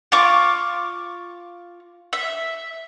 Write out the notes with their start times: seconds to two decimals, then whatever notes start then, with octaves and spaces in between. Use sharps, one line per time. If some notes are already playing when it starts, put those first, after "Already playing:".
0.12 F4 C#6 D6
2.13 E5